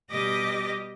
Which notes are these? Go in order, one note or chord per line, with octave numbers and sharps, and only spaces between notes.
B2 G3 G4 D#5 D6 A#6